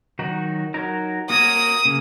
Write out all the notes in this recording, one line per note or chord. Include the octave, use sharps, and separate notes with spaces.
D#3 F#3 D#4 F#4
F#3 D#4 F#4 A#4
A#3 F#4 A#4 C#5 D#6
C#3 A#3